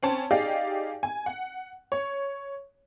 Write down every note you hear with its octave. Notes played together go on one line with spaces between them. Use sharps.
C4 C#4 A5
D#4 G4 G#4 D5 F5
G#5
F#5
C#5